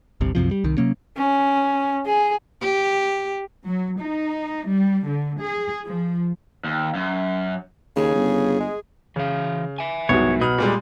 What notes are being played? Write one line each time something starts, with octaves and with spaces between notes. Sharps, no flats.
G1 C2 C3
C2 F#2 C3 F3
G3
C2 D#3
C3 F#3 A#3 C#4
C#4
G#4
G4
F#3
D#4
G3
D3
G#4
F3
D#2
F#2
D#2 C#3 G#4
G1
G#3
C#3 E3 F5
E5 G#5
C2 G#2 F#3 B3 C#5
B2 B5 D#6 F6
A#2 G3 G#3